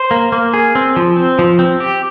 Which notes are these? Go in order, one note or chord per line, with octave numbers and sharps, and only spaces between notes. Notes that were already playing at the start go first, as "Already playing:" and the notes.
Already playing: C5
A#3
A#3
G#4
C4
F3
C4
F3
C4
G4